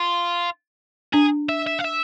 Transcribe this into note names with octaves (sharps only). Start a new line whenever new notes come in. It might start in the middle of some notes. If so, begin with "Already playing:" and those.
Already playing: F4
D4 G#4
E5
E5
F5
E5